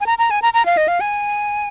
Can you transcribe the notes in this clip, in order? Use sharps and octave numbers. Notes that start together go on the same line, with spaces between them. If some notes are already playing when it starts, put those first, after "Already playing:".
G#5
A#5
A#5
G#5
A#5
A#5
F5
D#5
F5
G#5